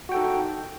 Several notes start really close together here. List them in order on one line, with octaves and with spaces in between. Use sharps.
F#4 G5 A4 D#4